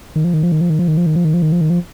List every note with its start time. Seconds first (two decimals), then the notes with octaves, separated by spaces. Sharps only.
0.16 D#3
0.24 F3
0.34 D#3
0.43 F3
0.52 D#3
0.61 F3
0.70 D#3
0.79 F3
0.88 D#3
0.97 F3
1.06 D#3
1.16 F3
1.25 D#3
1.34 F3
1.42 D#3
1.52 F3
1.61 D#3
1.70 F3